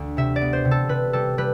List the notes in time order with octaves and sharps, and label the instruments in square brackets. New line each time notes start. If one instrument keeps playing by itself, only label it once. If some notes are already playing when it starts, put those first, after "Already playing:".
Already playing: [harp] D2
C3 E5
D5
B3
C5
C3
A4
C3 B4
G3 A4
G3 B4